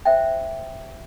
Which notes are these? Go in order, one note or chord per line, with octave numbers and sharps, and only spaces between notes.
C5 E5 G5